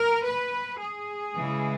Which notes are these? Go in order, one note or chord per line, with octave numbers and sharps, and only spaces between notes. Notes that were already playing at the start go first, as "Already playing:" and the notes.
Already playing: A#4
B4
G#4
C#3 E3 G#3